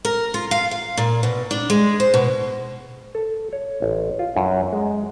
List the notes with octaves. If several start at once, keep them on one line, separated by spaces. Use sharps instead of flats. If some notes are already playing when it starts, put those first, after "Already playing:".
A#4
F4
F5
F5
A#2
B2
D4
G#3
C5
B2
A4
C#5
A1
F4
F#2
G#3